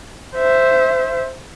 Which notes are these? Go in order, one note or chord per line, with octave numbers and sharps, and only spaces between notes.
C5 E5